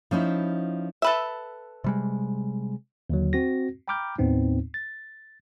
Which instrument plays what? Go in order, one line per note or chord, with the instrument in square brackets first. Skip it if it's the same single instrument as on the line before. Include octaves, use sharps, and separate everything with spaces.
[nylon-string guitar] F3 C#4 D#4 E4
[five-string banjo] A4 B4 E5
[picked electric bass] C3 G3 G#3
[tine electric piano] D#2 D3 F#3
C4 F#4 A#6
G5 A#5 B5 D6 F6 G6
D#2 A2 B3 C4 D#4
A6